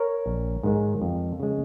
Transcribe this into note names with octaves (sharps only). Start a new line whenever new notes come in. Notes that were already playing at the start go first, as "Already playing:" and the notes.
Already playing: A#4 C#5
A#1
G#2 D#3 G#3
F2
C#3 G#3